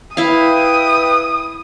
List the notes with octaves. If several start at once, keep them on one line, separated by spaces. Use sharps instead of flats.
E4 B4 E5 F5 G5 D#6